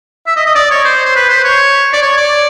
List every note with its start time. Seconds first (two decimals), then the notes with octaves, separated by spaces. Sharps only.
0.27 E5
0.36 D#5
0.46 D#5
0.55 D5
0.70 C#5
0.85 C5
1.06 C5
1.15 B4
1.30 C5
1.44 C#5
1.93 D5
2.02 C#5
2.17 D5